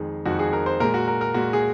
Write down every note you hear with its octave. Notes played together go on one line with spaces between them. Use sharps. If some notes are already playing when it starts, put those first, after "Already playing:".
Already playing: F2 D#3 G#3 G#4
F2 D#3 G#3 F#4
G#4
A#4
C5
A#2 G#3 A#4
F#4
A#4
A#4
A#2 G#3 F#4
G#4